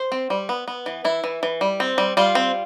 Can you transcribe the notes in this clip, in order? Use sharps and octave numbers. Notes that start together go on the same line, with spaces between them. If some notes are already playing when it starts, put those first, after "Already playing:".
Already playing: C5
C4
G3
B3
B3
E3
E3 E4
E3
E3
G3
C4
G3
G3 F4
C4